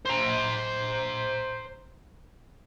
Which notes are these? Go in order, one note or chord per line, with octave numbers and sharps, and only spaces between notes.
C5 A#5